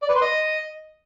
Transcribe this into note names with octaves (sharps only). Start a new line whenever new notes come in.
D5
B4
C6
D#5